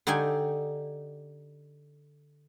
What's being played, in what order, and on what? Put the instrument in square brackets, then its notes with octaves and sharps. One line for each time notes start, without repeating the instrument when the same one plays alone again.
[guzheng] D3 D#4 G4 D5 G#5